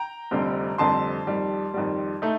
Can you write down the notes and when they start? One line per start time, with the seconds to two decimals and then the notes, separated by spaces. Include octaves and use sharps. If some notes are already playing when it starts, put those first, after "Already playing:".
Already playing: G5 A#5
0.31 F1 F2 D3 G3 C4
0.78 F1 F2 D3 G3 C4 A5 C6
1.27 F2 D#3 G3
1.74 F2 D#3 G3
2.22 A3 D#4